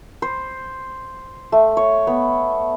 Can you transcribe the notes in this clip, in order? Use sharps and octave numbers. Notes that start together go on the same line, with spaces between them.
C5
A3
C#5
B3